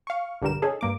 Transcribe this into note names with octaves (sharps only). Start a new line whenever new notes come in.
F5 C#6
B1 G2 D3 G3 A#4 E7
C#4 D#4 G#4 A4
G2 A#3 D6